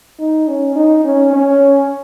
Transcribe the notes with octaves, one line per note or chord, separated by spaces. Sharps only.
D#4
C#4
D#4
C#4
C#4